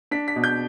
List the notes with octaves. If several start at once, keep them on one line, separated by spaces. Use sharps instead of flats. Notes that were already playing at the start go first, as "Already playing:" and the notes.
D4 B6
B6
B2
G6